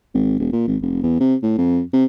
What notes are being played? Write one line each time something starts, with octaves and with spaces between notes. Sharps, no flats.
G#1
E1
A#2
G#1
F1
E2
C3
A2
F2
C3